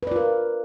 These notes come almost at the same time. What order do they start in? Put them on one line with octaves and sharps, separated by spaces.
B4 D5 F4 A#4